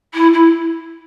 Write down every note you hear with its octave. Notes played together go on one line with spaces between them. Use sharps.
E4
E4